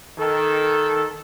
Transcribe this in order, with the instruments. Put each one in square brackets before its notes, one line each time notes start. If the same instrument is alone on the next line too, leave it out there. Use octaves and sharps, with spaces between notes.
[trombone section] D#3 A4